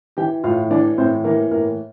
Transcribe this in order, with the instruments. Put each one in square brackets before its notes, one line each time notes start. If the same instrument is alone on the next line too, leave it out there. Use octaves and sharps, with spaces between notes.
[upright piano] E3 G4 G5
A2 F4 F5
E3 D4 D5
A2 C4 C5
E3 A#3 A#4
A2 A#3 A#4